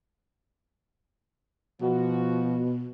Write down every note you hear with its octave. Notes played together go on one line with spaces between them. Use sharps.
B2 F3 F#4